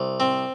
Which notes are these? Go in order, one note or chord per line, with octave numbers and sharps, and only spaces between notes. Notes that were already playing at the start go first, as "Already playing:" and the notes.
Already playing: C2
C4